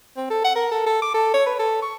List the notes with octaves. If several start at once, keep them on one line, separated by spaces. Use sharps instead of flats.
C4
A4
F#5
A#4
A4
A4
D6
A4
C#5
B4
A4
C#6